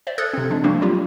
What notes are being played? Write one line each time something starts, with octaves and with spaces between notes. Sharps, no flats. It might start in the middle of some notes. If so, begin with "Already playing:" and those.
C5 D5 E5
A4 D#6 F6 F#6 G#6 A6
C3 C4
F3 G#3 D4
G3 A3 A#3 C4 D4 F#4
F#3 G3 F4 G4